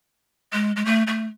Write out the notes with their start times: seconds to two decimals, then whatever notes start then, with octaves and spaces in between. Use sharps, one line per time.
0.53 G#3
0.76 G#3
0.85 A3
1.07 A3